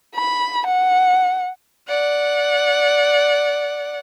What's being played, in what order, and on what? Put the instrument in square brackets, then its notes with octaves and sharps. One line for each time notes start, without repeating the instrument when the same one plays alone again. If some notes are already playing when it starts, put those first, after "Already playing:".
[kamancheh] B5
F#5
[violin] D5 F#5